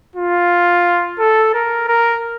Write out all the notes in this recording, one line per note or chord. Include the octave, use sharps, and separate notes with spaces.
F4
A4
A#4
A#4